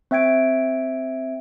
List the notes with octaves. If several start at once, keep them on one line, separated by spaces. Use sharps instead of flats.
C4 E5 G5 G#6 D7